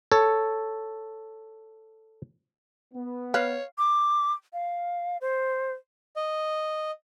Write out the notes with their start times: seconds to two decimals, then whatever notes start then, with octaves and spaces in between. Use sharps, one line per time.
0.12 A4 C#5
2.94 B3
3.34 B4 C#5 F5
3.78 D6
4.53 F5
5.21 C5
6.16 D#5